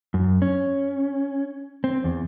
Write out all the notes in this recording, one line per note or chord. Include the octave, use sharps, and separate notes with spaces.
F#2
C#4
C4
E2